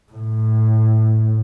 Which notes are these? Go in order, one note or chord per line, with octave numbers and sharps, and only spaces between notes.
A2